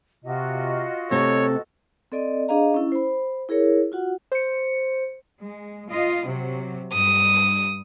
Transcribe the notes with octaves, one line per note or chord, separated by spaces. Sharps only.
C3 F4 F#4 D#5
C3 A3 C4 A4 C#5
C4 A4 D5 D#5
D4 G#4 D#5 F5 A#5
C#4 E4
C5 B5
E4 G#4 A#4 C#5
F4 F#4 F#5
C5 C#7
G#3
F4 D#5
C3 F#3
G2 D#6